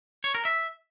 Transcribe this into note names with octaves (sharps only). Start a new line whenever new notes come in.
C#5
A#4
E5